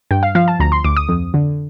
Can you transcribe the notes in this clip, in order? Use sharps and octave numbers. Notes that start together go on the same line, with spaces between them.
G2 G5
F5
F3 F5
A5
D2 A#5
C6
D2 D6
D#6
F2
D3